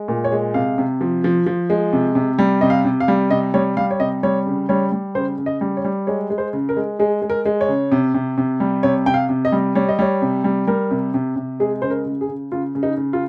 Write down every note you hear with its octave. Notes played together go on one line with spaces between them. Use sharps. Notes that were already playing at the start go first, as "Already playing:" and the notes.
Already playing: G#3
A#2
C#5
G#3
C3 F5
C3
F3
F3
F3
G#3
C3
C3
G3
C3 D#5
F5
C3
F5
G3
C3 D#5
G3 C#5
G3 F5
C#5
C3 D#5
G3 C#5
C#3
G3 C#5
G3
C#3 C5
C#3
D#5
G3
C#5
G3
G#3 C#5
G#3
C5
C#3
A#4
G#3
G#3 G#4
G#3
A#4
G#3
C#5
C#3
C3
C3
C3
G3
C3 C#5
C3 G5
F5
C3
D#5
G3
G3 C#5
D#5
G3 C#5
C3
G3
G3 A#4
C3
C3
C3
G#3 G#4
C#3 C5
A#4
C#3
G#4
C#3
C#3 F4
C#3
D#4
C#3
F4